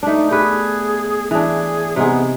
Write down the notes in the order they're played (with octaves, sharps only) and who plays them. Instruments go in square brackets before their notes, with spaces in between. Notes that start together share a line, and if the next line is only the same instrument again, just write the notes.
[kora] A3 D4 [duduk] D#4
[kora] B3 G4 B4 [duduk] G#4
[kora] E3 D4 [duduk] G#4
[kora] C3 D#4 G#4 [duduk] B3